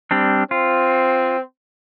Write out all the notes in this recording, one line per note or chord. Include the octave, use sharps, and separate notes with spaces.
G3 C4 D4
C4 F4